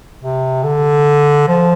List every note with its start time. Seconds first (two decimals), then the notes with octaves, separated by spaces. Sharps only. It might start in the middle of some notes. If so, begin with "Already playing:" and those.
0.22 C3
0.63 D3
1.48 F3